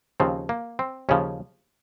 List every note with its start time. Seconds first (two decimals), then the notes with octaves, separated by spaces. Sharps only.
0.20 D#2 C#3 F3 C4
0.49 A#3
0.79 C4
1.09 D#2 C#3 F3 C#4